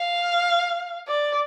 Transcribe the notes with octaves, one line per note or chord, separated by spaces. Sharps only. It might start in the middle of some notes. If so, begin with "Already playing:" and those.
Already playing: F5
D5